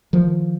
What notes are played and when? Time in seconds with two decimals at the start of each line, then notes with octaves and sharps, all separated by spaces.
0.13 D#3 F3